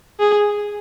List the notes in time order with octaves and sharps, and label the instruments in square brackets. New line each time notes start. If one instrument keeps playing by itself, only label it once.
[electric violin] G#4